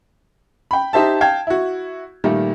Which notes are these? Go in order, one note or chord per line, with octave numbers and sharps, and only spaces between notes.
G5 B5
D#4 G4 C5 E5 A5
F5 G5 A5 G#6
E4 F#4
A#2 D#3 G3 A3